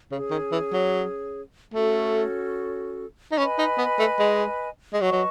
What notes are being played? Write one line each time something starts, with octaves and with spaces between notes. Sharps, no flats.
C#3 C#4 G#4 C#5
D#3
E3
F#3
A3 C#4 F#4 A4
D#4
C#4 B4 D#5 G#5 B5
D#4
B3
A3
G#3
G#3
F#3 B4 D#5 A5 C#6
F#3